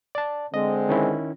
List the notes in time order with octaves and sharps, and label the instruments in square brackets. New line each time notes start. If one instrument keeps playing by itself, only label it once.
[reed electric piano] D5 A5
[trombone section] D3 G#3 C4 [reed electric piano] D#5
[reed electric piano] D#3 C#4 E4